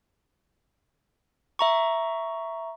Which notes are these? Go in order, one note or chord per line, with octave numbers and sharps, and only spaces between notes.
E5 A#5 C#6